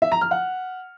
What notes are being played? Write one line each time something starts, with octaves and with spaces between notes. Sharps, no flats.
E5
A#5
F6
F#5